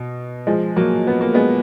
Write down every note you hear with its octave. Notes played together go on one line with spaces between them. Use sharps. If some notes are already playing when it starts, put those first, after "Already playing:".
Already playing: B2
F3 G#3
F#3 A#3
B3
A#3
G#3 B3